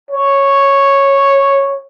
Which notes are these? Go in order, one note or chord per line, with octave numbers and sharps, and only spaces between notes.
C#5